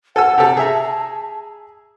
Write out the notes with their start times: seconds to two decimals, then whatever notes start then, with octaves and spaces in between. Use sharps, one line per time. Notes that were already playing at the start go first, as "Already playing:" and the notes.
0.16 A4 F#5 G#5 E6
0.38 C3 A4 A5
0.57 G#4 E5 A#5